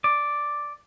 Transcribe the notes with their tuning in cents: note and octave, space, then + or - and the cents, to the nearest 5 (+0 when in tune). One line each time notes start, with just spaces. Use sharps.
D5 +0